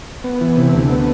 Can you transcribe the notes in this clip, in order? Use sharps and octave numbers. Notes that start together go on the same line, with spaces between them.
B3
E3
C3
D2
B3